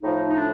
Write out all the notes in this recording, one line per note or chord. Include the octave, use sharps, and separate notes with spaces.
A2 F3 D#4
D#4
D4